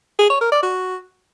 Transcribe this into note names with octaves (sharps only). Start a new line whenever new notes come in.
G#4
C#5
A#4
D5
F#4